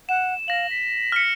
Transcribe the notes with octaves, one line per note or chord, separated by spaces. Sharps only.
F#5 E7
F5 A#6 F#7
B6
F6 C#7